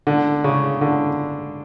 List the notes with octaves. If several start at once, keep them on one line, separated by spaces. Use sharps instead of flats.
D3
C#3
D3